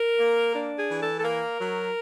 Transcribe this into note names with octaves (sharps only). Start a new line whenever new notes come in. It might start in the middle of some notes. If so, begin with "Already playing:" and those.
Already playing: A#4
A#3
D4
G#4
E3
A4
A4
A#3 A#4
F#3